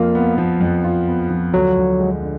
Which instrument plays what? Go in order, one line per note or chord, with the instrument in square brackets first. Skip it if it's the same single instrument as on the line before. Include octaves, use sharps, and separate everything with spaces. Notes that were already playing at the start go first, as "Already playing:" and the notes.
Already playing: [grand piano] F2 F4 [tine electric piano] A#3
[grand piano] B3
F3
F2
F4
B3
F3
[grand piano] D2 [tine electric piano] F#3
[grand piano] D2
G#3
D3